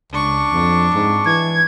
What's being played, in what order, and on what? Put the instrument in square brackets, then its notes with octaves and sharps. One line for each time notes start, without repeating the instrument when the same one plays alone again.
[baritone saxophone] C#2 [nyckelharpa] D4 C#6
[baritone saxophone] F2
G#2
[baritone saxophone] E3 [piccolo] G#6